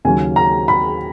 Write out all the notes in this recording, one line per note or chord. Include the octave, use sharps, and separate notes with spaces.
D#2 C#3 F#3 C#4 G#5
A#5
B5